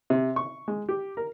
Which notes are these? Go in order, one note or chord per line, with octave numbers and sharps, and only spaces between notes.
C3
C#6
G#3
G4
A#4